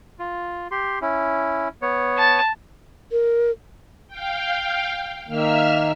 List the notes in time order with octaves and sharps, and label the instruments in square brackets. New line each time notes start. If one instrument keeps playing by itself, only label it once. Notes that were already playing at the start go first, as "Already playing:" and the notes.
[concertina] F4
G4 C6
C#4 E4
B3 C#5
[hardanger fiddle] A5
[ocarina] A#4
[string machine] F5 G5
[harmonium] D#3 A#3 [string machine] E5 E6 F6